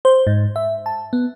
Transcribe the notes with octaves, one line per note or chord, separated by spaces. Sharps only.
C5
G#2
E5
A5
B3